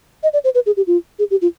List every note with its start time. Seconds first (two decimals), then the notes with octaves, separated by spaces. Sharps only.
0.23 D#5
0.33 D5
0.44 C5
0.55 B4
0.66 G#4
0.77 G4
0.87 F4
1.19 G#4
1.31 G4
1.42 F4